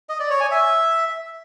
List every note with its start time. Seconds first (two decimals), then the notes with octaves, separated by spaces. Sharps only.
0.09 D#5
0.20 D5
0.30 C#5
0.40 G#5
0.51 E5